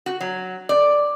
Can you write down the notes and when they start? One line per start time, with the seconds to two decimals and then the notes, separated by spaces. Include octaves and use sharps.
0.06 F#4
0.21 F#3
0.69 D5